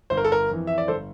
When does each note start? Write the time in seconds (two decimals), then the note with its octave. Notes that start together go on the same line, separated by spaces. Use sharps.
0.10 G1 C5
0.17 A#4
0.25 A4
0.32 A#4
0.49 F2 E3
0.67 E5
0.78 D5
0.88 G1 A4 C5